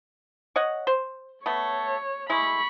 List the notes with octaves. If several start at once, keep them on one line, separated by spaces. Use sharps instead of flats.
C#5 D#5 F#5
C5
A3 B3 C#5
G#3 E4 B5 C#6